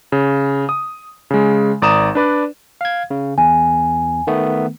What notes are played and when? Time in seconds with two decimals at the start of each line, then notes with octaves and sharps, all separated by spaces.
0.12 C#3
0.69 D#6
1.31 C#3 G#3
1.82 G#1 D5 A#5 D#6 E7
2.15 D4 B4 D5
2.81 F5 G#6
3.10 C#3
3.38 E2 G#5
4.27 D#3 A3 B3